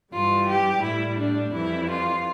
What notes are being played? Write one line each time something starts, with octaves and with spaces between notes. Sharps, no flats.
G2 E3 G3 F4
G4
A2 G3 E4
D4
F2 E3 G3 E4
F4